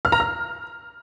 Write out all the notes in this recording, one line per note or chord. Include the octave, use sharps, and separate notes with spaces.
F6
A#5
F6